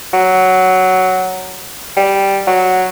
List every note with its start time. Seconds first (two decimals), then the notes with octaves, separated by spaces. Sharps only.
0.13 F#3
1.97 G3
2.47 F#3